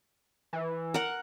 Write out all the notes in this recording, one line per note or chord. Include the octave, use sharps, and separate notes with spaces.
E3
A#4 F#5